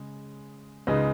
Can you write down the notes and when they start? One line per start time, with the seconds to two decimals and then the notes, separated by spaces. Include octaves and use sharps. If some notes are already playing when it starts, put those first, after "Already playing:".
Already playing: C#3 G#3
0.87 C#2 C#3 G#3 D#4 B4 D#5